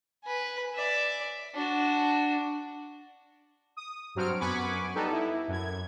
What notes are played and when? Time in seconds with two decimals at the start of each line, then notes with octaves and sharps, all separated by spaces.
0.24 B4 G#5
0.74 D5 E5
1.54 D4 F#4
3.77 D#6
4.15 G2 F#3 C4 F6 D7
4.40 F#2 B3 G#5 B5 C#6 D6
4.95 G3 B3 D#4 A4
5.12 E4
5.48 F#2 G#6